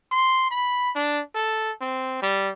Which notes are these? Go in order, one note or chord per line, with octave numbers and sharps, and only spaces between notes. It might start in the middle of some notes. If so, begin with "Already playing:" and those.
C6
B5
D4
A4
C4
G3